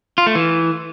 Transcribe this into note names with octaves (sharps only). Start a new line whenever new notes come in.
F4
A3
E3